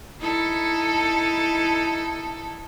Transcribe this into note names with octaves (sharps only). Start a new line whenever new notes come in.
D#4 E4 A4